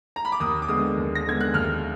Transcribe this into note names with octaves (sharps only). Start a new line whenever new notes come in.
A#5
B5
D6
D#2 D#6
D6
D3 G#3 B3 D#6
D#2
A#6
D3 G#3 B3 G#6
F#6
D#2 F6